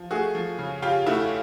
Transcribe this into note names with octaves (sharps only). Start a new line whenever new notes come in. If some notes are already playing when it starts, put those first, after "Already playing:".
Already playing: F3
A3 F#4 G#4
F3
C#3
C#3 F4 G4
A3 E4 F#4